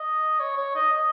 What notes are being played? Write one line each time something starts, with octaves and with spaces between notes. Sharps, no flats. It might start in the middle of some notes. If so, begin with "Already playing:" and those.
Already playing: D#5
C#5
C#5
D#5
D#5